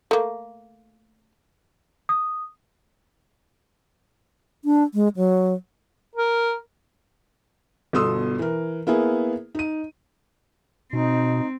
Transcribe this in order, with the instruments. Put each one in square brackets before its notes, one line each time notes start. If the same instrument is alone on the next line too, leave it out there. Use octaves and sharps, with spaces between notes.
[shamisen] A3 A#3
[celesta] D#6
[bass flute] D4
G#3
F#3
[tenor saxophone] A#4
[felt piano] G1 B2 A4 C6 D#6 E6
E3 A#4
A#3 B3 E4 G#4
D#4 D#7
[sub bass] B2 [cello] C4 [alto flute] D#4